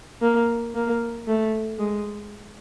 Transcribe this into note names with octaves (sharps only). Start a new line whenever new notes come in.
A#3
A#3
A3
G#3